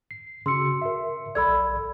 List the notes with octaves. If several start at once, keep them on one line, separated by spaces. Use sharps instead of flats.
C7
C#3 F#4 C6 E6 C#7
A#4 E5
A#1 A4 D5 B5 E6 G#6